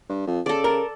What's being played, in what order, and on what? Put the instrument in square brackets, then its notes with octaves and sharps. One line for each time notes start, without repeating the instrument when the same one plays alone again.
[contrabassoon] G2
F2
[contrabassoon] C#3 [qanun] A4 D5
[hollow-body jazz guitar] A#4